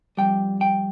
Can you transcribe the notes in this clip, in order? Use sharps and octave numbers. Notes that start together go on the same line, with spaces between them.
F2 C3 G3 G5
G5